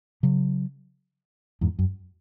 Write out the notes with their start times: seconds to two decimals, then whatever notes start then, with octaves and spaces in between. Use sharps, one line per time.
0.23 C#3 F#3
1.61 E2 G#2
1.79 F#2